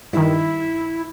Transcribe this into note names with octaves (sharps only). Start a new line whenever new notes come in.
G2 D#3 E4